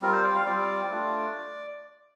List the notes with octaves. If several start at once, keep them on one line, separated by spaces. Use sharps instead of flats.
G3 C4 F4 A#4
C5
D5
F5
G3 C4 F4 D5
A3 D4 F4